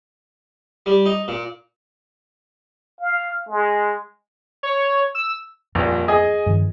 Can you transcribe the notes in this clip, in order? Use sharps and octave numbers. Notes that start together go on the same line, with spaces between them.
G3
D#4
A#2
F5
G#3
C#5
E6
D#1 A#1 F2
G#4 D#5 G#5
G2 D#3 F3